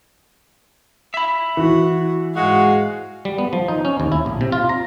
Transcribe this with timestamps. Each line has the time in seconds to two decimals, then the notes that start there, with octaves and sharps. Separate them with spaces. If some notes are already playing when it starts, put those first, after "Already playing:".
1.14 E5 B5
1.57 E3 F#4
2.35 G#2 G#3 F#4 F5
3.25 G3
3.38 B3
3.53 F3
3.68 D#4
3.85 C#4
4.00 D#2
4.12 E4
4.26 A#1
4.41 C3
4.52 F4
4.69 A#5